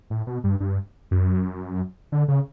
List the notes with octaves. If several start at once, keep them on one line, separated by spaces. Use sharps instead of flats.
A2
B2
G2
G2
F#2
D3
C#3